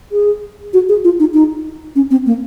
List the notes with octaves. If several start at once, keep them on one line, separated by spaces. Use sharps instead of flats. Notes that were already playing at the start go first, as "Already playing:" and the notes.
G#4
F#4
G#4
F4
D#4
D#4
C#4
C4
A#3